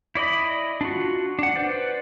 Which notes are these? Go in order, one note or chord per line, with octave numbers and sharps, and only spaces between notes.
E4 D5 D#5 B5
D4 F4 F#4
D4 F#5
B4 C5 D5